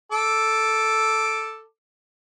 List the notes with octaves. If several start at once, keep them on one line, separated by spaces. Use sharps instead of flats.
A4 D6